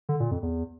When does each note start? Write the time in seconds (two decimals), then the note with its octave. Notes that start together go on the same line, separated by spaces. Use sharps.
0.09 D3
0.20 A#2
0.31 F2
0.43 E2